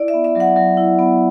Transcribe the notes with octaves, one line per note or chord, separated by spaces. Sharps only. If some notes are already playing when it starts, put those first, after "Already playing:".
Already playing: E4 D5
E5
B3
E5
F#3 F#5
F#3
E4
B3